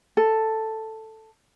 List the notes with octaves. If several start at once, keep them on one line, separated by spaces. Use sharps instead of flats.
A4